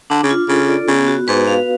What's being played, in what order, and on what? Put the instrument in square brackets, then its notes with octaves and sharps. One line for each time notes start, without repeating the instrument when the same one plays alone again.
[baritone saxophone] D3 [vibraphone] D4
[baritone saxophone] C#3
[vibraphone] F4
[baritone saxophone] C#3 [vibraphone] A4
[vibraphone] D5
[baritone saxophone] C#3 [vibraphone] B3
[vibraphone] F#4
[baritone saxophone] G#2 [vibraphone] B4
[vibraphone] F5